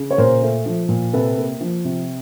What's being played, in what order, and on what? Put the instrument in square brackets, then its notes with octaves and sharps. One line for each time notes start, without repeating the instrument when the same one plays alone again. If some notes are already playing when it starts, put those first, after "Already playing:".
Already playing: [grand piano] C#3
C#5
A#2 A#4 C5
A3
F3
A#2
C3 A4 B4
A#3
F3
C3